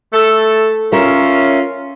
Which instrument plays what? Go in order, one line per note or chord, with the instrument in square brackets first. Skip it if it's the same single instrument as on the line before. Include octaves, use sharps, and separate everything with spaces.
[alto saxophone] A3 [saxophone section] A4
[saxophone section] C#4 [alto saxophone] F4 [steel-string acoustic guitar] A#4 E5